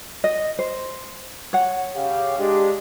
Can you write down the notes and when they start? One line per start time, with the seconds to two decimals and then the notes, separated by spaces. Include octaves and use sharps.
0.24 D#5
0.59 C5
1.53 C#5 F#5
1.95 C#3 G4 F5
2.38 G#3 D4 G4